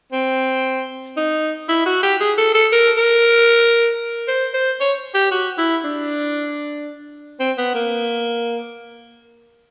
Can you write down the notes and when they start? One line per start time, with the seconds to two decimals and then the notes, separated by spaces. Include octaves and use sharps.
0.12 C4
1.17 D#4
1.69 E4
1.86 F#4
2.03 G4
2.21 G#4
2.38 A4
2.55 A4
2.73 A#4
2.98 A#4
4.28 C5
4.54 C5
4.81 C#5
5.15 G4
5.31 F#4
5.58 E4
5.84 D4
7.40 C4
7.58 B3
7.74 A#3